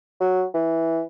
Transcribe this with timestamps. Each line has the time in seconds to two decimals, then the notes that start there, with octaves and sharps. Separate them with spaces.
0.20 F#3
0.54 E3